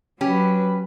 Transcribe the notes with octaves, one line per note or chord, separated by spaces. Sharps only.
F#3 C#4 G4 B4